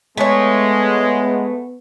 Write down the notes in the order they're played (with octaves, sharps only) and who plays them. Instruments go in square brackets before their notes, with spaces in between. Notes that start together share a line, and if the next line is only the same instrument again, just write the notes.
[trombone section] G#3 [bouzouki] A3 C#5 [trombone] B3